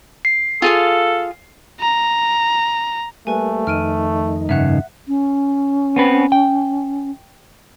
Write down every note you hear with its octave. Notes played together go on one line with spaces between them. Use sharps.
C7
F4 G#4 A4 F5
A#5
G3 A3 A#3 B4 G#5
F2 D#3 D#4 F6 D7 D#7
G2 C#3 E5 F#5 F#6
C#4
B3 C4 B4
G5